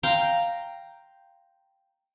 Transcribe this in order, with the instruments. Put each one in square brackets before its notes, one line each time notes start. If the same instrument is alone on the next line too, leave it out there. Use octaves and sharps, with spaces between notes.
[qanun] F5 G5 A#5 C6